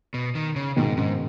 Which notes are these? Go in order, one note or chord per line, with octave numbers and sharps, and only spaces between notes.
B2
D#3
C#3
G#2 B2 D#3
G#2 C#3